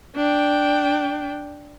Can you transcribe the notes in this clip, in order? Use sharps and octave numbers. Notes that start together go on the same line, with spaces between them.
D4 G5